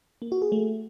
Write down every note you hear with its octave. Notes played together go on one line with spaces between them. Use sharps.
A#3
F#4
G#4
A3